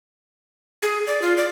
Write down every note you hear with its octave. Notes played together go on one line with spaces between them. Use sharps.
G#4
D5
F4
D5